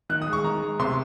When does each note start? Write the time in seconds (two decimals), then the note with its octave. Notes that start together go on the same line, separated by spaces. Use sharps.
0.10 D#3 F#6
0.22 D#6
0.27 G#3
0.33 C#6
0.44 D#3 A#5
0.62 G#3
0.79 C3 C6